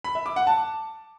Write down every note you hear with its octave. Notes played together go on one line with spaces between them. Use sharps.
B5
E5
D6
F#5
A5